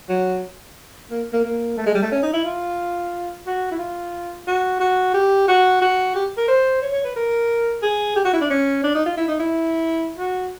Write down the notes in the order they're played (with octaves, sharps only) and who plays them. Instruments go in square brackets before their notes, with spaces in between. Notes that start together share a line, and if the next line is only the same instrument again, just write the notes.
[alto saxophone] F#3
A#3
A#3
A#3
A3
G#3
G3
A3
C#4
D#4
E4
F4
F#4
E4
F4
F#4
F#4
G4
F#4
F#4
G4
A#4
C5
C#5
C#5
B4
A#4
G#4
G4
F#4
E4
D4
C#4
D4
D#4
F4
E4
D#4
E4
F#4